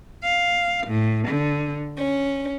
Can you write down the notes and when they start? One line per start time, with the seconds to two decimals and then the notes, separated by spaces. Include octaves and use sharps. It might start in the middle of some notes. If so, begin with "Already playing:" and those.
0.23 F5
0.87 A2
1.28 D3
1.97 C#4